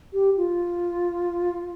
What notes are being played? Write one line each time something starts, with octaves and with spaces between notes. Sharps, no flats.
G4
F4